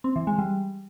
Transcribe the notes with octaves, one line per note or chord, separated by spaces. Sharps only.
C4
E3
G#3
G3